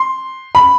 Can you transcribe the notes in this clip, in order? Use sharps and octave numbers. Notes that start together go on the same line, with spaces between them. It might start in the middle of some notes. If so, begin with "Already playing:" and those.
Already playing: C6
B5